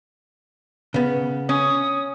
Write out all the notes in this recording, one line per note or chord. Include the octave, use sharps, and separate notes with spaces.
C#3 B3
C#4 D#6